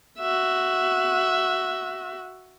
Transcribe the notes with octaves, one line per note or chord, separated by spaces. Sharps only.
F#4 E5